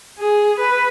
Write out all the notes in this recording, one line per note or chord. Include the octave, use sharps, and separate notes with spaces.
G#4
B4